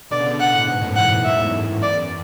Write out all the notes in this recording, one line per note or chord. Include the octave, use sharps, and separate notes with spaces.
B2 D3 D5
C#3
B2 D3
B2 D3 F#5
A2 C#3
G#2 B2
F#2 A2
E2 G#2 F#5
G#2 B2
F#2 A2 E5
E2 G#2
F#2
E2 D5
E2
F#2